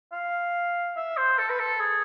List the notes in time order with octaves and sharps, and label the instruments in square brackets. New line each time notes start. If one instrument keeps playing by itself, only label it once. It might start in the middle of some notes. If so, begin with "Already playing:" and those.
[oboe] F5
E5
C5
A4
B4
A4
G#4